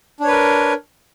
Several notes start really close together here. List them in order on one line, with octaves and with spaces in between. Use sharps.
D4 C#5 B4 A#4